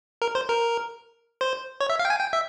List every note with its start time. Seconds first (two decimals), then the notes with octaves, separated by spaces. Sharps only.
0.22 A#4
0.35 C5
0.49 A#4
1.41 C5
1.81 C#5
1.90 E5
1.99 F5
2.05 G5
2.10 G#5
2.20 G5
2.33 E5